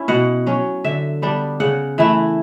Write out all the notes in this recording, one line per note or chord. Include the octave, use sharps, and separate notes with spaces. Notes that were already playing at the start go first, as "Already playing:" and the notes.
Already playing: C#4 E4
B2 F#5
F#3 C#4
D3 E5
G3 B3 D4
C#3 F#5
E3 A3 E4